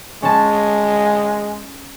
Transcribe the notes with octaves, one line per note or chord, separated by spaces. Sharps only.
G#3 C#4 A5